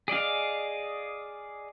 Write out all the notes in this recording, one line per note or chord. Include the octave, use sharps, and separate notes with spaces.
G#4 D5 D#5 F5